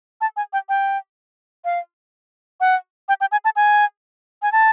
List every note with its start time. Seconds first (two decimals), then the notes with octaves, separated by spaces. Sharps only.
0.21 A5
0.37 G#5
0.53 G5
0.69 G5
1.65 F5
2.61 F#5
3.09 G5
3.21 G5
3.32 G#5
3.45 A5
3.56 G#5
4.42 G#5
4.52 A5